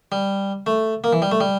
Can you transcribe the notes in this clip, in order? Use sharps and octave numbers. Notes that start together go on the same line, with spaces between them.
G3
A3
A#3
E3
G3
A3
G3